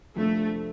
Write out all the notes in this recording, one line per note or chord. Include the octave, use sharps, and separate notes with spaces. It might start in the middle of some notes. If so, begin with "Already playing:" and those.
F2 C3 F3 A3 A#3 D4